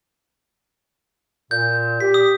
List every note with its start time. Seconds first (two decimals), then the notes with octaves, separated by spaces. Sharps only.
1.51 A#2 G6
2.00 G4 B6
2.14 D#6